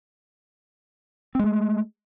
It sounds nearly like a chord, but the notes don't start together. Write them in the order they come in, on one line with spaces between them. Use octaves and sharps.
C4 G#3 A3